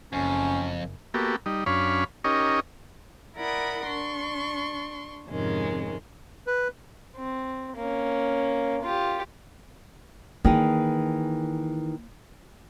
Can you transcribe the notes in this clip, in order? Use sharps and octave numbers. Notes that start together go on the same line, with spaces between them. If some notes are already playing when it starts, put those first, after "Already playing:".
F#1 F2 C#4
A#3 B3 F#4 G4 A4
G3 D#4
F#2 C#4 D4 C#5 F5 B5
C#4 D#4 G4 A#4 C#5 D#5
E4 A#4 D5 F#5 B5 D#6
D4 C6 C#6
F2 G#2 C3 D#3 G#3 C#4
B4
C4
A#3 C#4
F4 G4
D#3 E3 A#3 G#4